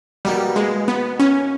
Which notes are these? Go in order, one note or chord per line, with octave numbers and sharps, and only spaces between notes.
B2 G3 A#3 D#4
G#3
B3
C#4